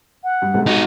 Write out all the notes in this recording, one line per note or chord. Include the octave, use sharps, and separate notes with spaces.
F#5
G2
B1 G#2 C3
D#4 F#4